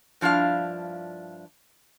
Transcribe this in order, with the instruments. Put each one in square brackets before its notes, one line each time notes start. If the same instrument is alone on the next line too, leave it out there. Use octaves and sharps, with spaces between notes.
[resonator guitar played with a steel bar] G2 F3 D4 E4 F5